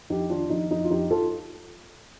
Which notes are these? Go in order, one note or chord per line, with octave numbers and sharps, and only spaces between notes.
F2 D#4 G4
D#3 D4 F4
F2 D#4
F2 D#4
F4
F2 D#4 G4
F4 A4